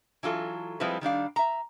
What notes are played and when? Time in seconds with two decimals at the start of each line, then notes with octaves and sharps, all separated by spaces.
0.23 E3 F#3 F4 A4
0.80 F3 G3 G#3 C4 E4 B4
1.01 D#3 G3 D4 F5
1.36 E5 A#5